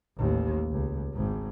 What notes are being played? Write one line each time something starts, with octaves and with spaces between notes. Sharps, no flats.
A1 D#2
C#2
G#1 G#2